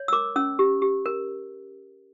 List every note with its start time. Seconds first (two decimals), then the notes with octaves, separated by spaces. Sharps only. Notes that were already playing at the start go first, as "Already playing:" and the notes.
Already playing: C#5
0.08 E6
0.12 A#4 D6
0.36 C#4 E6
0.59 G4
0.82 G4
1.06 A#4